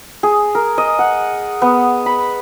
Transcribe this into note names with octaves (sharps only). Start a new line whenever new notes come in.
G#4
A#4
D#5
F#5
B3
B5